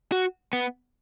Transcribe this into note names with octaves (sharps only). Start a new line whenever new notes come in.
F#4
B3